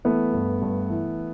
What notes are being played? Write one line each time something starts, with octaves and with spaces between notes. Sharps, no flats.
E3 A3 B3
G2
G2
E3